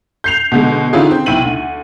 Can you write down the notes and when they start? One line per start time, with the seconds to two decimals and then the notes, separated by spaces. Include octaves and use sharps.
0.24 G6 C7 F7
0.52 B2 D3 G#3
0.93 D3 D#3 C#4 E4 F4 G#4
1.11 C4
1.26 B1 E4 G5 D#7 F#7
1.44 D2